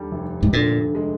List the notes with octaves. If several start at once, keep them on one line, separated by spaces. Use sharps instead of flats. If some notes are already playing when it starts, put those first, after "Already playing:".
Already playing: D#2 D3 G3
F1
G#2
A#2 D3
G#3